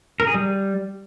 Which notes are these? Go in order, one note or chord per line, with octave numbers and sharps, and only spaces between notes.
A#4
G#4
G3